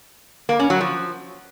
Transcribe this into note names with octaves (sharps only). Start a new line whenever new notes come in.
A#3
C#4
F#3
F3